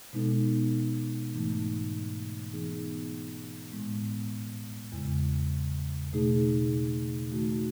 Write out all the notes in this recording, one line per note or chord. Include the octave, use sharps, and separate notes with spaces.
B2 G#3 B3 D#4 A4
G#2 E3 A3 D#4
E3 B3 D#4 G#4
A2 G#3 B3
E2 C#3 G#3
B2 A3 D#4 G#4
D#3 A3 D#4 F#4